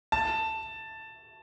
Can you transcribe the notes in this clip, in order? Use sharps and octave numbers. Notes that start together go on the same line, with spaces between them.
A5